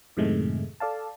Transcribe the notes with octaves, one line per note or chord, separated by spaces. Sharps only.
F#2 A2 C3 D#3 G#3 A3
A4 D5 F5 A5